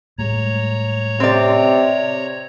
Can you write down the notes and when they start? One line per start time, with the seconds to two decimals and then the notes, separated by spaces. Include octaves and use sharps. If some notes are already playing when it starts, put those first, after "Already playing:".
0.18 A2 G3 G#3 C#5 A#5
1.20 C3 C4 D5